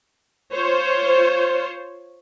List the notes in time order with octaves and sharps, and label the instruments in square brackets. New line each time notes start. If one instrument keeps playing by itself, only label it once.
[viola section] F4 C5 C#5